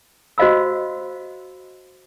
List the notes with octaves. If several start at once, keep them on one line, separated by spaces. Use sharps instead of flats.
F#4 C5 D#5 F5 B5 E6